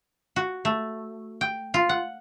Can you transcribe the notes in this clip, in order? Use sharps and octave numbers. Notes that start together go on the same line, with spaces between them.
F#4
A3
G5
F4
F#5